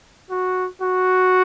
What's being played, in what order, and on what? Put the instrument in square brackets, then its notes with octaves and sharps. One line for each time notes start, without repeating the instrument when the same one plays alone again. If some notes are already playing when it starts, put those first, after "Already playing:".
[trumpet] F#4
F#4